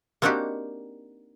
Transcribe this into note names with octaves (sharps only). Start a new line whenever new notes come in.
A#3 C4 D4 D#4 F#4 G4